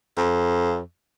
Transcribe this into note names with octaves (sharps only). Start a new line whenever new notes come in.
F2